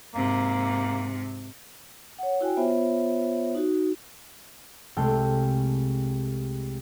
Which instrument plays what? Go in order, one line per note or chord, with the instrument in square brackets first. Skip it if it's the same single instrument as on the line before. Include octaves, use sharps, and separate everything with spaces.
[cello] G#2 C3 [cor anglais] A#3
[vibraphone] C#5 F#5
E4 F#4 G5 G#5
B3 F4 C5 C#5 E5
D#4 F#4
[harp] C2 G#3 A3 A4 G5 F6